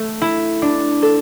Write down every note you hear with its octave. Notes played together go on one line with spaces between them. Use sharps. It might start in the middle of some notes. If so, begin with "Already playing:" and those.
Already playing: A3
E4
D4
A4